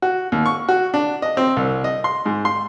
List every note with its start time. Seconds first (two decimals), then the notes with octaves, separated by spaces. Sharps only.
0.02 F#4
0.32 D#2
0.46 C#6
0.69 F#4
0.94 D4
1.22 D#5
1.37 C4
1.57 C2
1.84 D#5
2.04 C6
2.26 G#2
2.45 C6